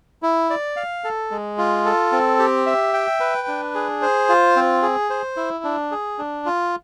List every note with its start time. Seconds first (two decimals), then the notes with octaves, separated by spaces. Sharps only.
0.22 E4
0.50 D5
0.76 F5
1.04 A4
1.31 G#3
1.58 F4
1.85 A4
2.12 C4
2.39 G4
2.66 E5
2.94 G5
3.20 B4
3.48 D4
3.75 G#4
4.02 C5
4.29 F4
4.56 C4
4.82 G#4
5.10 C5
5.37 E4
5.64 D4
5.91 G#4
6.18 D4
6.46 F4